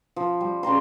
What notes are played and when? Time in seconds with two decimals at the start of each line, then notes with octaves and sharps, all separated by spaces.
0.16 F3
0.41 G3
0.63 C#3 D5 A#5 C6